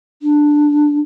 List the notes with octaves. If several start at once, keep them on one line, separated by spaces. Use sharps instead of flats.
D4